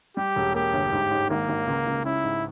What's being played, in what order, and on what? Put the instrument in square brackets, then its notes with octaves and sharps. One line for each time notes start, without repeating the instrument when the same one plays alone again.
[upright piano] G3 [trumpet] G4
[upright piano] E1
[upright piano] A#3 [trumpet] G4
[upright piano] G1
G#2
G#2
[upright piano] G#1 [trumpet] A#3
[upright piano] G#1
C#2
C#2
[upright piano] C#4 [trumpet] E4
[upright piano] G#2